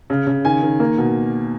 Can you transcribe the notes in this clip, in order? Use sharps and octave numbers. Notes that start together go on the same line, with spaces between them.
C#3
C#3
D#3 G#5
D#3
A#3
B2